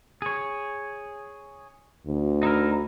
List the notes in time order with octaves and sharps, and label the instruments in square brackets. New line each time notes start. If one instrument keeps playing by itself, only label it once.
[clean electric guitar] G#4 C#5
[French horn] D2
[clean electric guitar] D#4 E4 A#4